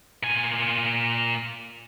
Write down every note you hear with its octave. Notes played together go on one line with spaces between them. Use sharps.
A#2 G#5